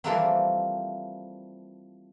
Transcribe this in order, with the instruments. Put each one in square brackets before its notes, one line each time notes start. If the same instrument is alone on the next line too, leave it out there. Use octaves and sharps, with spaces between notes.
[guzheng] E3 F3 G3 A3 A#3 C4